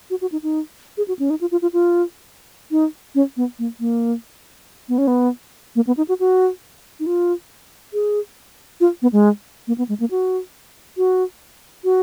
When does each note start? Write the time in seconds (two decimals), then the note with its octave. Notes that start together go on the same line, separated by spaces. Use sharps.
0.10 F#4
0.21 F#4
0.32 D#4
0.43 D#4
0.97 G#4
1.08 F#4
1.19 C#4
1.30 D#4
1.41 F4
1.52 F4
1.62 F4
1.73 F4
2.71 D#4
3.15 C#4
3.37 B3
3.59 A#3
3.80 A#3
4.89 B3
4.98 C#4
5.07 B3
5.76 A#3
5.87 B3
5.97 D#4
6.09 F#4
6.20 F#4
7.00 D#4
7.06 F4
7.93 G#4
8.81 F4
9.02 B3
9.13 G#3
9.68 A#3
9.78 B3
9.89 G#3
10.00 A#3
10.11 F#4
10.97 F#4
11.84 F#4